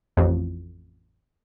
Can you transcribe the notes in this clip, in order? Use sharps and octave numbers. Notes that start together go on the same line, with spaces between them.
A1 F2